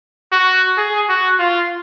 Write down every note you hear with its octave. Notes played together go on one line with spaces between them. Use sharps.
F#4
G#4
F#4
F4